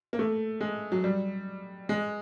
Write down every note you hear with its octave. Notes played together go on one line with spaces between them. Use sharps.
A#3
A3
G#3
F#3
G3
G#3